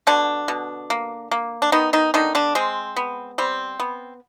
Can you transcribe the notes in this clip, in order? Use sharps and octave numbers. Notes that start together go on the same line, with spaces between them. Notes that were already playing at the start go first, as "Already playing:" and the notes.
B2 D3 D4
B2
A#3
A#3
D4
D#3 B3 D#4
D#3 D#4
D3 D#3 D#4
D3 D4
G#3 C4
B3
G3 C4
B3